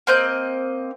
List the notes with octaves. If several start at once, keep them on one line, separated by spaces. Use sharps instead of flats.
A#3 C4 D#5 G6